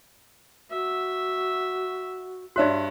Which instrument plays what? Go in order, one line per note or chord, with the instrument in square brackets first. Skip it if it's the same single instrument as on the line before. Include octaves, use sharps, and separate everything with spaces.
[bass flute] F#4 [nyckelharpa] E5
[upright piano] G2 E5 F#6 [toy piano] F#4 C#5 D5